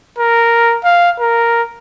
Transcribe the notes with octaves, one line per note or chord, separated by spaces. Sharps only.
A#4
F5
A#4